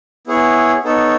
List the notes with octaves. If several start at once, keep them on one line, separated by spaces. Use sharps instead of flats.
B3 E4 G#4 C#5
B3 D#4 A4 C#5